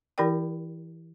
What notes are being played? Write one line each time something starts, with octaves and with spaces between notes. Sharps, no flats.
E3 E4 G4 A#4 D5 G5